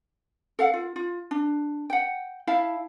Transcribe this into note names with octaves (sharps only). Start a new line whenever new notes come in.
A4 F5 F#5
F4
F4
D4
F#5 G5
E4 F5 A5